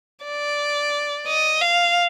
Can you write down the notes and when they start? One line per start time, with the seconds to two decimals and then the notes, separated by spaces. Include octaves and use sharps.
0.25 D5
1.27 D#5
1.61 F5